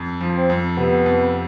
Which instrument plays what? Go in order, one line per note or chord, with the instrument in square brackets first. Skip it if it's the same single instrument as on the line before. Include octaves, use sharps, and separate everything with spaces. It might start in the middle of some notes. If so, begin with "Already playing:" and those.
Already playing: [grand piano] F2
F3
[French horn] C4
[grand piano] F2
[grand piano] C3 [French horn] B3
[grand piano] F2